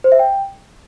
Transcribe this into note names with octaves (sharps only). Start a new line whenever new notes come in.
C5
E5
G5